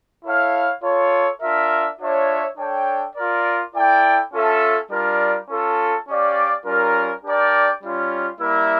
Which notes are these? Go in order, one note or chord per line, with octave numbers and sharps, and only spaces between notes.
E4 A4 C#5 F5
F4 A4 C#5
D4 F4 A#4 E5
D4 F4 C#5 E5
D4 A4 C#5 G5
F4 A#4 D5
E4 A4 D5 G5
C#4 F4 A4 E5
G3 D4 F4 A#4 D5
C#4 F4 A4
C#4 G4 D5 F5
G3 C#4 F4 A#4
D4 G4 A#4 D5 G5
G3 C#4 F4
G3 A#3 E4 A#4 E5